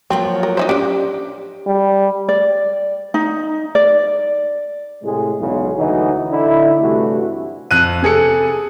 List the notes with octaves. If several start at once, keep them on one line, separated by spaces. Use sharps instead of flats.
F3 F#3 A#3 C4
A#4
D#4 E4 C5
C#4 D4 G4
G3
D5
D#4
D5
A2 C3 G#3
B1 E2 C#3 G#3
D2 E3 F#3 D#4
D3 D#4 E4
G2 C3 E3 A3 F#4
F2 F#6 D#7
C3 G#4 A4 C#7